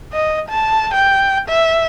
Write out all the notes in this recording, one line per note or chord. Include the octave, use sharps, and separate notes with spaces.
D#5
A5
G5
E5